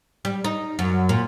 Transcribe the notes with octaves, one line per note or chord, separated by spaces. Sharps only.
G3
D#4
F#2
A#2